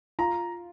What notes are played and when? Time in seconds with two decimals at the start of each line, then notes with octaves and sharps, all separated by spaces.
0.19 F4 A#5